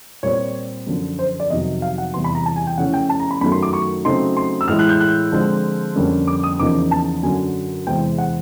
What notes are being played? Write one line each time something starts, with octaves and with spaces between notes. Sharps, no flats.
A#2 G3 C4 C#5
F#2 D3 F3
C5
D5
F2 C3 D#3 F#3 D#5
F5
F#5
E2 C3 E3 G3 C6
B5
A#5
A5
G#5
G5
C#3 F3 A3 C#4 E4 F#5
G5
A5
A#5
B5
F#2 D#3 F#3 A3 B5
C6
D6
C#6
C#3 F#3 A3 C4 D#4 C6
C6
E6
A2 E3 G#3 F6
F#6
G6
F#6
D3 F3 G#3 C4
F2 D3 G3 A#3 C#4
D6
D#6
E2 C#3 F3 A#3 D#4 D6
A5
F#2 D3 F#3 G#5
E2 C3 E3 G#3 C4 G5
F#5